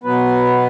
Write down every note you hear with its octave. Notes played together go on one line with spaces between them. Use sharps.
B2 F#3 B3 B4